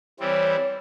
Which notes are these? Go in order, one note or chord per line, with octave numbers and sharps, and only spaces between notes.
E3 G3 C4 C#5